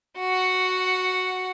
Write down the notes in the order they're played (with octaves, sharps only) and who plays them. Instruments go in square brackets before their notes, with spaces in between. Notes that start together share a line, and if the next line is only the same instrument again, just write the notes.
[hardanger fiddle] F#4 F#5